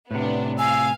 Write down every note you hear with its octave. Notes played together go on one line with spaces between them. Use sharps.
A2 C3 B3 D4
F5 G#5 E6